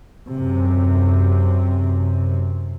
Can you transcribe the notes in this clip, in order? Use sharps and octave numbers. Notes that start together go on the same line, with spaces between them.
F#2 C3